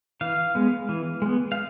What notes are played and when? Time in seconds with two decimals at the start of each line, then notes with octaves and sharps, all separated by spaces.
0.21 E3 F5
0.55 G#3 B3
0.89 E3
1.22 G#3 B3
1.52 F5